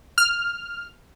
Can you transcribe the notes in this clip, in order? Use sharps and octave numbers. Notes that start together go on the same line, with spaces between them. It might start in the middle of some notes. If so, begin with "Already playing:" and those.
F6